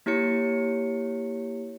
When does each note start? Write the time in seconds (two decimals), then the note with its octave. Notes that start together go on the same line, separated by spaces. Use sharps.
0.06 A#3 E4 G4 C#5 C#7